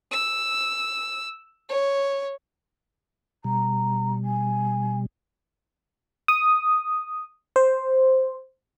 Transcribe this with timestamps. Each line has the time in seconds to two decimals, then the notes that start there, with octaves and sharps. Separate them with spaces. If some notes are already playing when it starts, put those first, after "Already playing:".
0.11 E6
1.69 C#5
3.44 B2 G3 A#5
4.25 G#5
6.28 D#6
7.56 C5